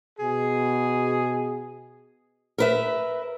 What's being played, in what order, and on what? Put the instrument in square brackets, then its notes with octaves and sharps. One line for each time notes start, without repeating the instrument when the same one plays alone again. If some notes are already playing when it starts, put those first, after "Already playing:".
[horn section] B2 G#4
[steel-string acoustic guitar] A#4 B4 E5